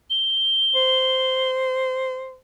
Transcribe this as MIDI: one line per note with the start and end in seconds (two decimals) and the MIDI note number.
0.10 1.50 103
0.75 2.37 72